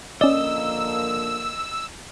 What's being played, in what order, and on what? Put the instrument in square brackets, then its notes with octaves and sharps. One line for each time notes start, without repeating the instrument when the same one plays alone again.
[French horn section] D3 F3 A#3 [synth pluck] C#4 D5 [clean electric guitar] D#5 [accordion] E6